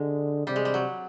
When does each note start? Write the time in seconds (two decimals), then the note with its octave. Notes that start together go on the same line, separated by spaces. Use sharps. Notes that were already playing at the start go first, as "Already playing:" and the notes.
Already playing: D3 G#3
0.47 C3 G3
0.56 G#3
0.65 G3
0.74 F#3